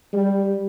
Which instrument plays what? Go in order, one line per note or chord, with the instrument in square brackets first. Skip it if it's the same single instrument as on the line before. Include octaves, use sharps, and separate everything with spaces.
[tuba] G3